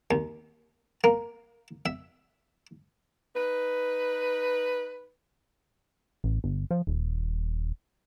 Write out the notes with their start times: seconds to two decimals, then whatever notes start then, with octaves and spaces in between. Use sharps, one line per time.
0.11 D#2
1.04 A#3
1.86 E5
3.36 D#4 B4
6.24 A1
6.44 G1
6.71 F3
6.87 D#1